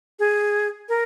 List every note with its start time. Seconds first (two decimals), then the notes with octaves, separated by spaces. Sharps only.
0.19 G#4
0.89 A#4